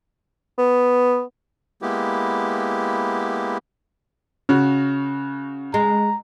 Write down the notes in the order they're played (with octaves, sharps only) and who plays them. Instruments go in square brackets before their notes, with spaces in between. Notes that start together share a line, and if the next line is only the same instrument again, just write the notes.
[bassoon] B3
[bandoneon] G#3 A#3 B3 E4 G4
[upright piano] C#3 F#4 [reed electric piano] C#4
[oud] G#3 [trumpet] A#5